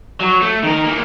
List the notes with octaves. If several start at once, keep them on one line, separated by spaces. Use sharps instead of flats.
F#3
A3
D#3 A#4
E3 A#3